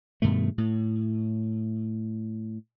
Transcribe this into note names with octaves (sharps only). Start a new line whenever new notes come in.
G2 B2 D#3 A3
A2